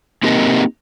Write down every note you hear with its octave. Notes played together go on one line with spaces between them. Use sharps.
A#3 C4 D#4 G4 A#4 D#5